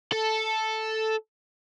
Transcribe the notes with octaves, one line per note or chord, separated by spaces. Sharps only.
A4